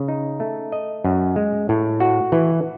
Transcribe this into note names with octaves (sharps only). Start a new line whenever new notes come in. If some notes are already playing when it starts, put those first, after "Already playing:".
Already playing: C#3
D#4
A3
D#5
F#2
G#3
A2
F#4
E3